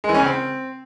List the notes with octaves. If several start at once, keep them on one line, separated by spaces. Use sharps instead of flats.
G#3
E3
C#4
C#3
C4